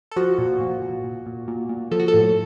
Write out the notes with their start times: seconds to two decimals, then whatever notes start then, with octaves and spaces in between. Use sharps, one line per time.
0.11 A4
0.16 F3 F#4
0.38 A#2
0.60 A#2
0.82 A#2
1.04 A#2
1.26 A#2
1.48 A#2
1.69 A#2
1.91 F3 A4
2.00 F#4
2.08 A4
2.14 A2